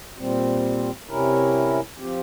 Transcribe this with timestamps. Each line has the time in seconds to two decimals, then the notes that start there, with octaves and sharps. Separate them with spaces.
0.18 A#2 G3 C4
1.09 C3 G3 C#4 E4 A#4
1.98 F3 C4 G4